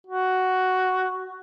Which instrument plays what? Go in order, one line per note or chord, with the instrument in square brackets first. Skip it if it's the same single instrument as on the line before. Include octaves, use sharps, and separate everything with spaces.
[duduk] F#4